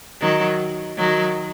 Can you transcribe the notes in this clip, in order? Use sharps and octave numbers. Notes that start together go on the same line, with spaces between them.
D#3 F#3
D#3 F#3